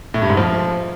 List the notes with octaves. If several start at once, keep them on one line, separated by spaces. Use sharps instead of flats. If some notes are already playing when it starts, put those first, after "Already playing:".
A2
G2
G#2
F3